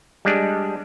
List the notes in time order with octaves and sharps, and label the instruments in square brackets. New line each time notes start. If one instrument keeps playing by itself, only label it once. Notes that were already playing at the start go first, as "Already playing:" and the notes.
[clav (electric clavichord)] G3 G#3 D4